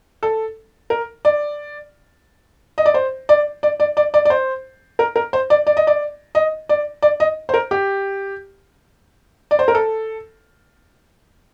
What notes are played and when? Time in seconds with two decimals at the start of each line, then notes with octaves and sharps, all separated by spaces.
0.23 A4
0.90 A#4
1.25 D5
2.78 D#5
2.86 D5
2.94 C5
3.29 D5
3.63 D5
3.80 D5
3.97 D5
4.14 D5
4.25 D5
4.30 C5
4.99 A#4
5.16 A#4
5.33 C5
5.50 D5
5.67 D5
5.77 D#5
5.87 D5
6.35 D#5
6.69 D5
7.02 D5
7.20 D#5
7.49 C5
7.54 A#4
7.71 G4
9.51 D5
9.59 C5
9.68 A#4
9.75 A4